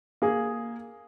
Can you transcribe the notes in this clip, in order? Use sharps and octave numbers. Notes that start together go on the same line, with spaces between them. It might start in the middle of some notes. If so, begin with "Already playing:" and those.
A#3 G#4